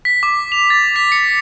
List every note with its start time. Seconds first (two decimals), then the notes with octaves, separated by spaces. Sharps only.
0.05 B6
0.23 D6
0.52 F7
0.70 A6
0.96 B6
1.12 C#7